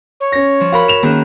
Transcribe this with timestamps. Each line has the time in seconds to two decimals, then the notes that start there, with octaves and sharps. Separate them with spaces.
0.20 C#5
0.32 C#4 A#6
0.61 F3
0.72 F#4 A#4 F5 B5
0.88 E7 F7
1.03 D#3 A#3 C#4 G#4 F#6